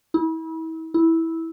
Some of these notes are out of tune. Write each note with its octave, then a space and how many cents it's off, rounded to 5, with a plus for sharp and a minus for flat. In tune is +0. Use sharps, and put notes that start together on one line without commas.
E4 -35
E4 -10